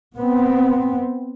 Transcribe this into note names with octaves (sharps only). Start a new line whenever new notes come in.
B3 C4